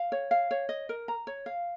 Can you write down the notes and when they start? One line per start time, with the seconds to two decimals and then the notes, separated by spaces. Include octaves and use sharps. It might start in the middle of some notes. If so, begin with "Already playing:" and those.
Already playing: F5
0.12 C#5
0.31 F5
0.51 C#5
0.69 D#5
0.89 A#4
1.08 A#5
1.27 C#5
1.46 F5